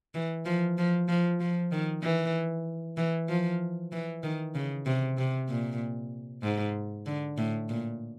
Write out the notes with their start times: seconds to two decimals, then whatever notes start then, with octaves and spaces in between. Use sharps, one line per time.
0.14 E3
0.46 F3
0.78 F3
1.08 F3
1.40 F3
1.72 D#3
2.03 E3
2.97 E3
3.29 F3
3.92 E3
4.23 D#3
4.55 C#3
4.86 C3
5.18 C3
5.49 A#2
6.43 G#2
7.06 D3
7.38 A2
7.69 A#2